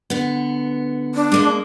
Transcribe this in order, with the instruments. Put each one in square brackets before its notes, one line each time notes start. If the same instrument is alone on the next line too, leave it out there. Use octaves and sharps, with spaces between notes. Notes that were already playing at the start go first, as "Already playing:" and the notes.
[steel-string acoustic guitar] D3 B3
[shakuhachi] D4
[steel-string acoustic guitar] G#3 A#3 A#4